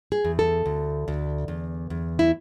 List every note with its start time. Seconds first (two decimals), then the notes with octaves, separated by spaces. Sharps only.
0.12 G#4
0.24 E2
0.39 A4
0.66 D2
1.08 D2
1.48 E2
1.90 E2
2.19 E4